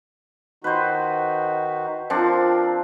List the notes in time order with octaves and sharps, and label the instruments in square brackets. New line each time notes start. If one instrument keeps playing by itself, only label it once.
[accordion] D#3 D#4 F#4 [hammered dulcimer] B4 C5
[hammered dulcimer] F3 C4 D4 [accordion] A#4